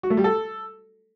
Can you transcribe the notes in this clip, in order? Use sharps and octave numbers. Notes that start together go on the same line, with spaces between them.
F#4
A3
G3
A4